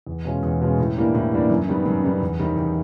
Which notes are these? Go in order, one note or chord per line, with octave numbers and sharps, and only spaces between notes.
E2
B2 G#3 C#4 F4
E2
B2 G#3 C#4 F4
A2
E3 G3 A#3 D4
A2
E3 G3 A#3 D4
F#2
D#3 G3 B3
F#2
D#3 G3 B3
E2
C3 D#3 G3
E2